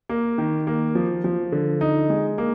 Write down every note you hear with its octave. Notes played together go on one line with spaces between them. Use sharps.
A#3
D#3
A#3
F3
F3
D3
D#4
G#3
A#3